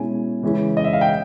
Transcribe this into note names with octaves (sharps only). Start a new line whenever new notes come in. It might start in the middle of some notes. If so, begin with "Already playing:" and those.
Already playing: B2 G#3 C#4 E4 G#5
C#3 E3 G#3 C#4 E4
D#5
E5
F5
G5